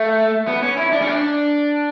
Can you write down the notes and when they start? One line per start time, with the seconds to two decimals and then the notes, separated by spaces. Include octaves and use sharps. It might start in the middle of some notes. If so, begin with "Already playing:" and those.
Already playing: A3
0.48 B3
0.62 C#4
0.77 E4
0.92 D4
1.01 C#4
1.07 D4